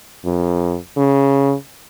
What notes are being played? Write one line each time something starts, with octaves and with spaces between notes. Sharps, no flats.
F2
C#3